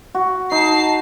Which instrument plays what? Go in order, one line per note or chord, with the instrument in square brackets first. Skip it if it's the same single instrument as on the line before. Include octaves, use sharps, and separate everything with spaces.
[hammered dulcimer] F#4
[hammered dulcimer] D#4 [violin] A5 C7